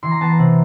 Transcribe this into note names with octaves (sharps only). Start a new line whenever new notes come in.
E3 C6
A#5
B3 A5
A#5
C3